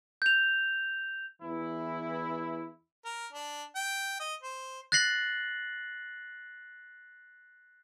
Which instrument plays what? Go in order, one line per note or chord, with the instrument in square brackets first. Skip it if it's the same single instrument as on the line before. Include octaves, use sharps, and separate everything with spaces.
[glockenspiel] G6 F7
[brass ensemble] E2 E3 E4
[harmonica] A#4
D4
G5
D#5
C5
[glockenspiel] F#6 A6 A#6 C7 F#7